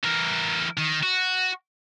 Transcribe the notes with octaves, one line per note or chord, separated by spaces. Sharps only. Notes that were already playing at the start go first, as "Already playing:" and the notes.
E3 A#4
D#3
F#4